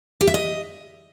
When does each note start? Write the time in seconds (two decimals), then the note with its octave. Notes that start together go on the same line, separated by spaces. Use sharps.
0.21 G4
0.27 E5
0.34 D#5